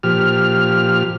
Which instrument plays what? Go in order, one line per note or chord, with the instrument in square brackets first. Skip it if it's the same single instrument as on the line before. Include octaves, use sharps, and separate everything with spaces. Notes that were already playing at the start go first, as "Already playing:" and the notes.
[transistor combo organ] A#2 F3 G4 F6